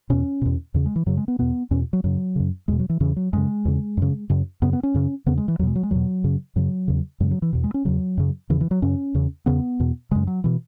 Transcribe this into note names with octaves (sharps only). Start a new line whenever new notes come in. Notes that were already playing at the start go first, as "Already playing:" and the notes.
E2 B2 C#4
E2 B2
E2 C#3
G#3
E3
F#2 C#3 F#3
G#3
B3
E2 B2 B3
E2 B2 C#4
F#3
F#2 C#3 F#3
F#2 C#3
E2 B2 G#3
F#3
E3
E2 C#3 E3
F#3
F#2 C#3 G#3
E2 C#3
F#2 C#3
F#2 C#3
F#2 C#3 B3
B3
C#4
F#2 C#3
E2 C#3 B3
G#3
E3
E2 B2 F#3 G#3
F#3
G#3
E2 B2 F#3
F#2 C#3
F#2 C#3 F#3
E2 C#3
F#2 C#3 G#3
F#3
E3
E2 B2
G#3
C#4
E2 C#3 F#3
F#2 C#3
E2 C#3 E3
E3
F#3
F#2 C#3 C#4
E2 C#3
E2 C#3 B3
E2 B2
F#2 C#3 G#3
F#3
B2 E3